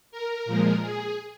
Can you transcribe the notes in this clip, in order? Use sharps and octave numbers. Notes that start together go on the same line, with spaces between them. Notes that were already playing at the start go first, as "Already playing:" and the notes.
A#4
A#2 F3 G#3
G#4